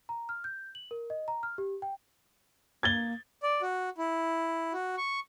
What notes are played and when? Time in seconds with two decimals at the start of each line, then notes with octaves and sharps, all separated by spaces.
0.09 A#5
0.29 F6
0.44 G6
0.75 F#7
0.91 A#4
1.10 D#5
1.28 A#5
1.43 F6
1.58 G4
1.82 G5
2.83 A#3 G#6 A6 G7
3.43 D5
3.62 F#4
3.98 E4
4.73 F#4
4.97 C#6